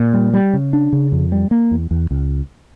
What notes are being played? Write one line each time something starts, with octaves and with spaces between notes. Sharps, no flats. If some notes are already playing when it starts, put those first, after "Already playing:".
Already playing: A#2
G3
G3
C#3
D4
C#3
F2
G3
A#3
E2
E2
C#2